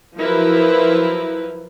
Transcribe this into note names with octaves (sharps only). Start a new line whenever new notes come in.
F3 F#3 E4 A#4 B4